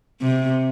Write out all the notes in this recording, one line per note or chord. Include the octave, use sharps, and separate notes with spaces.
C3